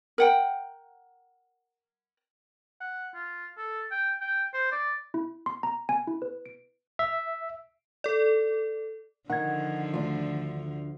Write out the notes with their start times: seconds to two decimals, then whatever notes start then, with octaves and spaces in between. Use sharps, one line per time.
0.18 A#4 F#5 G5
2.81 F#5
3.14 F4
3.57 A4
3.91 G5
4.21 G5
4.54 C5
4.72 D5
5.14 E4
5.46 C6
5.63 A#5
5.89 G#5
6.07 E4
6.22 B4
6.46 D7
6.99 E5
8.04 A4 D5
9.30 D3 D#3 F3 F#5 G#6
9.94 D2 D#3 F4